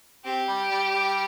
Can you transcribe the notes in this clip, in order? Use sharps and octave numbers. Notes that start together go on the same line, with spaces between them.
C4 G4
G3
G3
G3